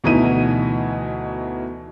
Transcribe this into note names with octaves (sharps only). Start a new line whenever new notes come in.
D2 B2 E3 D#4 E5 D#7